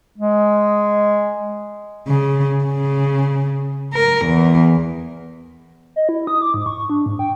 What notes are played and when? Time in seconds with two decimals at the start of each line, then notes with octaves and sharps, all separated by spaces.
0.18 G#3
2.08 C#3
2.64 C#3
3.94 A#4
4.26 E2
5.96 D#5
6.09 E4
6.27 D#6
6.42 D6
6.54 G#2
6.66 C#6
6.90 D4
7.06 G#2
7.19 G5